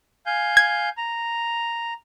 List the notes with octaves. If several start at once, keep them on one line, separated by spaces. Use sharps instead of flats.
F5 G#5 G6
G#6
A#5